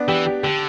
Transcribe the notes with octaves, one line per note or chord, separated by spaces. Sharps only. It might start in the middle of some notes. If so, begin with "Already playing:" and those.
Already playing: B3 D4
E3 G4
G4
D3 G4